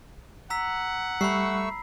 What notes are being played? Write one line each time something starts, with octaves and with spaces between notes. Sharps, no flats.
F#5 A#5 E6 B6
G3 A3 B5 C#6 E6 C7